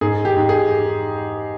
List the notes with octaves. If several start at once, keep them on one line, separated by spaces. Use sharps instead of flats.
G#2 G#4
G4
G#2
G#4